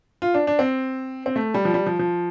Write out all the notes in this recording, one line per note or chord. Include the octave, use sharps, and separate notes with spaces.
F4
D4
D4
C4
C4
A3
G3
F3
G3
F3
F3